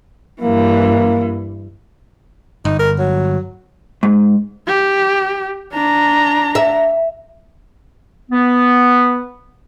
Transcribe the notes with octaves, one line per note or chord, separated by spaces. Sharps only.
G2 E3 A#3
G1 D#4
A#4
F#3
G#2
G4
D4 A#5
E5
B3